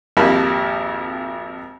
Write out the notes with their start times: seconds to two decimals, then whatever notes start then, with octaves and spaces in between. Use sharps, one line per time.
0.17 G#1 F2 A#3 G4 A5 B5